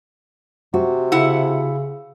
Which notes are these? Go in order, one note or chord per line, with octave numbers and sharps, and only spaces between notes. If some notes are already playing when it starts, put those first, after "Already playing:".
C3 F#4
C#3 E4 F#5